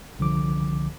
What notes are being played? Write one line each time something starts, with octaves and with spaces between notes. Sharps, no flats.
C2 D3 F3 D6